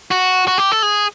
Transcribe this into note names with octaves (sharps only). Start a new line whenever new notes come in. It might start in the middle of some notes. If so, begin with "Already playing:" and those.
F#4
F#4
G4
A4
G#4